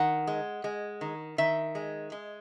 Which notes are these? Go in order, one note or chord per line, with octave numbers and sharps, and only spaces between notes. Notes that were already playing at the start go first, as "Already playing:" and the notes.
Already playing: D#3 F#5
G#3
G#3
D#3
D#3 E5
G#3
G#3